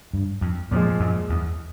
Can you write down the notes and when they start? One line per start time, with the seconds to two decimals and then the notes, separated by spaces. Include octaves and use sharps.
0.13 G2
0.41 F2
0.71 F2 A#2 F3 G#3
1.00 F#2
1.29 E2